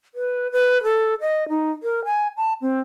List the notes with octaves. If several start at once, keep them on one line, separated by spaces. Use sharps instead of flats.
B4
B4
A4
D#5
D#4
A#4
G#5
A5
C4